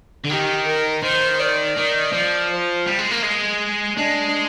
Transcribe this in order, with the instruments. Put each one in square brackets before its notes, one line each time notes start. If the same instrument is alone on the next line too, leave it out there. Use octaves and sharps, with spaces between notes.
[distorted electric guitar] D3
[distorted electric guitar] D#3 [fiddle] G4
[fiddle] A#4
[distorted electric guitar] D#3 [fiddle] C5
[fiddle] D5
[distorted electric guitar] D#3
F3
[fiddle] C5
[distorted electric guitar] G3
G#3
A#3
G#3
[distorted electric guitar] G#3 [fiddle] D4